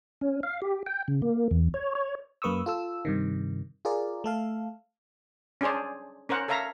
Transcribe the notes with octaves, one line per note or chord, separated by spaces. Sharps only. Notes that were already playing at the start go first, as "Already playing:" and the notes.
C#4
F5
G4
G5
C#3
A#3
E2
C#5
C#5
F#2 A#3 B4 C#6 D#6 E6
F4 A4 E6
G2 C3 D#3
F4 G#4 A#4 D5
A3 A4 F5
C#4 D4 G#4 C5 D5
C#4 A#4 C5 F#5
A4 C#5 E5 F5 A#5